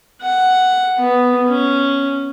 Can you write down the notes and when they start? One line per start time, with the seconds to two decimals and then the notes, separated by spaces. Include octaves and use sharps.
0.22 F#5
0.99 B3
1.49 C#4